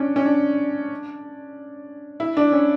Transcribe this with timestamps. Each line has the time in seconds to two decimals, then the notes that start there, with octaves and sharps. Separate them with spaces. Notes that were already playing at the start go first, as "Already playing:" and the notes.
Already playing: C#4 D4
0.16 C#4
0.26 D4
2.20 E4
2.37 D4
2.52 C#4